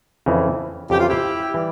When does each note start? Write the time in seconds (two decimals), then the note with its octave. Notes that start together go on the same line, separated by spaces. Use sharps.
0.26 F2 C#3 E3
0.90 F2 C#3 E3 G4
1.00 F4
1.08 E4 G4
1.54 E3 G3